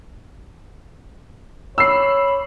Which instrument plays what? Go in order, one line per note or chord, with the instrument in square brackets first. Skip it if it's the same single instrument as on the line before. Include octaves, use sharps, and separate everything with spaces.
[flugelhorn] C#5 [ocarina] B5 [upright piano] E6 C7